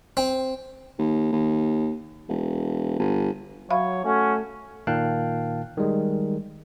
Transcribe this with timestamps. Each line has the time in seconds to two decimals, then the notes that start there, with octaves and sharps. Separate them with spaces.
0.17 C4
0.99 D#2
1.32 D#2
2.29 E1
2.99 G1
3.70 F#3 C#5 E5 F5 B5
4.05 A3 C#4 F#4
4.87 A#2 D#3 F5 G5 A5 F#6
5.77 D#3 G3 G#3